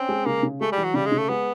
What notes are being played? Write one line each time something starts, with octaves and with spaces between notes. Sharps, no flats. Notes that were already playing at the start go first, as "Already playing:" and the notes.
Already playing: C4 C#4
G#3
C#3 A#3
C#3
G#3 A3
G3
E3
F#3
C#3 G3
G#3
C#3
A3
G#3 B3